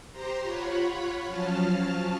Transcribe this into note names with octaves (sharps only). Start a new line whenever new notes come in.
G4 C5 A#5 C6
F4 C#5 F#5 B5
F3 F#3 C#4 F4 A5 F6